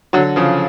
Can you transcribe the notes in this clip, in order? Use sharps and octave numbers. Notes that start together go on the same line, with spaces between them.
D3 F#3
C#3 F3